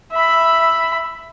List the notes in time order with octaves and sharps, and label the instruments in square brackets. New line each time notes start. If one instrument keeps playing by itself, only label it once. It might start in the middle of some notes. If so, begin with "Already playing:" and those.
[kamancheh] E5 B5